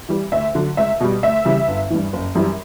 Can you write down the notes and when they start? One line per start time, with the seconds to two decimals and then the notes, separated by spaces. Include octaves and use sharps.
0.09 E3 G3
0.32 D2 E5
0.55 D3 F#3
0.77 C#2 E5
1.00 B2 G3
1.23 D2 E5
1.45 C#3 E3 G3
1.68 G1
1.90 G2 E3
2.13 F#1
2.35 F#2 E3 G3